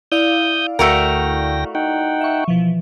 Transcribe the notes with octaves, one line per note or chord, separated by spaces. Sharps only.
E4 D5 F5 D#6 G6
D2 A3 F#4 A#4 G5 A#6
D#4 F#5 G5
E5 C#6
B2 E3 F3